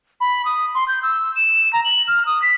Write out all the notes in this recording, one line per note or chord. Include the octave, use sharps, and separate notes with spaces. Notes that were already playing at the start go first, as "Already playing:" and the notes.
B5
D#6
C6
G6
E6
E7
A#5
F#7
F6
D#6
B6